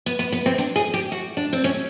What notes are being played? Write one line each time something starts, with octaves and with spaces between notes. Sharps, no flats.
B3
B3
B3
C4
D4
G#4
G4
F#4
D4
C4
C#4